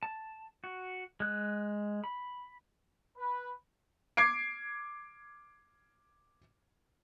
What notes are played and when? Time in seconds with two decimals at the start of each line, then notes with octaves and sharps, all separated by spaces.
0.03 A5
0.64 F#4
1.20 G#3 F#6
2.04 B5
3.17 B4
4.17 D6 G#6 C7 D7